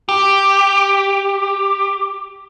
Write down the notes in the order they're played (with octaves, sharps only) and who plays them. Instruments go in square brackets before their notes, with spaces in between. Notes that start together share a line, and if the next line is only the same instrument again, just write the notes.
[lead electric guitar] G4